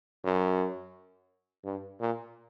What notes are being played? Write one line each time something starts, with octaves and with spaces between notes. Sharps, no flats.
F#2
G2
A#2